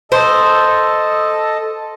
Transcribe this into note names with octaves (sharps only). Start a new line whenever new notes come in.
A4 C5 D#5